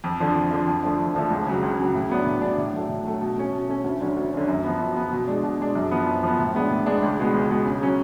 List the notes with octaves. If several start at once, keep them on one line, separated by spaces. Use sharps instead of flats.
F2
D3 F3
F2
D3 F3
F2
D3 F3 A3
F2
D3 F3 A3
C#2
C#3 F#3
C#2
C#3 F#3
A2
F#3 B3 D4
A2
F#3 B3 D4
A2
F#3 A3
A2
F#3 A3
B2
A3 C#4
B2
A3 C#4
D2
D3 F#3 C#4
D2
D3 F#3 C#4
F#2
F3 B3
F#2
F3 B3
B2
G#3 D4
B2
G#3 D4
F#2
F3 B3
F#2
F3 B3
A2
G#3 B3 D4
A2
G#3 B3 D4
C#2
B2 G#3 B3
C#2
B2 G#3 B3
C#3
F#3 C#4